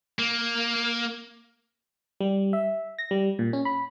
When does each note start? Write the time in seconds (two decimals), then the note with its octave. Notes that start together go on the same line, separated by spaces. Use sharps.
0.19 A#3
2.20 G3
2.53 E5
2.99 A#6
3.11 G3
3.39 A#2
3.53 C#4
3.65 B5